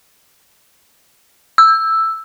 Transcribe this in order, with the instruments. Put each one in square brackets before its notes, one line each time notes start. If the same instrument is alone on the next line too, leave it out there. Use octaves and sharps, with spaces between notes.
[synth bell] E6